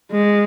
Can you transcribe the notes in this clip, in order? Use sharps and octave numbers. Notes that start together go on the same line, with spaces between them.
G#3